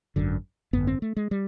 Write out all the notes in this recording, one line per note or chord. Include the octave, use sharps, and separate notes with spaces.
G#1 F#2 D3
G#1 F#2 D3 B3
C4
A3
G#3
G3